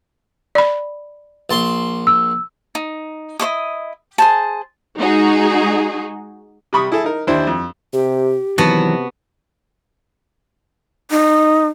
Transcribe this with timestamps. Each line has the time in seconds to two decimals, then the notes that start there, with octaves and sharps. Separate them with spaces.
0.55 D5 B5
1.50 A#1 A5 C6
2.07 E6
2.75 D#4
3.40 E4 C5 D#5 D#6
4.18 G#4 C5 A5
4.98 G#3 D#4 F#4 G#4
6.73 C3 G3 B5 C#6 D#6
6.92 E4 G#4 A4
7.04 D#4 A#4
7.27 D#2 D4 E4 C5
7.47 F2
7.93 C3 G4
8.58 C3 D#3 E3 F#3 B3 F#4 A5
11.11 D#4